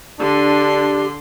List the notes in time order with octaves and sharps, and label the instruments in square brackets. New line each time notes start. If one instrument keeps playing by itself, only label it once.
[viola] D3 C6 [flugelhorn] D4 [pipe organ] G4